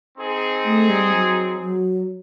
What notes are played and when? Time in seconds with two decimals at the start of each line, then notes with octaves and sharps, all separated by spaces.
0.17 C4 D#4 G#4
0.64 A3
0.89 G3
1.13 F#3
1.60 F#3